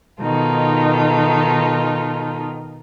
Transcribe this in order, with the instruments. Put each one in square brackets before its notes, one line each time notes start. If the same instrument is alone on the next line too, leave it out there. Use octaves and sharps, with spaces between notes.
[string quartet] B2 D#3 D#4 F4 A4